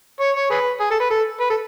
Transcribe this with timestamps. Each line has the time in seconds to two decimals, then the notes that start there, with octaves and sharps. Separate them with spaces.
0.20 C#5
0.36 C#5
0.50 G#4 B4
0.80 G#4
0.90 A4
1.00 B4
1.10 A4
1.40 B4
1.50 A4